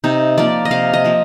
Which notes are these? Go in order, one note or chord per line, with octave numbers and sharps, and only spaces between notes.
C3 D#4
F3 A#3 D5
D#5
C3 F5
D#5
F3 A#3